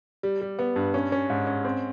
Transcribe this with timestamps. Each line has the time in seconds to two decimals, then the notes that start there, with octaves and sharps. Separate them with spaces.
0.23 G3
0.41 G3
0.59 B3
0.76 G2
0.94 C#4
1.12 C#4
1.30 G#2
1.47 C#4
1.65 C4